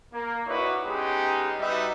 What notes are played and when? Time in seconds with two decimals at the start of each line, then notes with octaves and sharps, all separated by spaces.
0.12 A#3
0.46 D#4 E4 F#4 B4 C#5 D5
0.84 G#3 B3 C#4 D#4 G4 G#4
1.58 G3 D#4 F#4 B4 E5